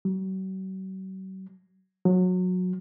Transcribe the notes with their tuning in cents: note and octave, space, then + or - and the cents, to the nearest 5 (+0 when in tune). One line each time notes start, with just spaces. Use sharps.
F#3 +40
F#3 -25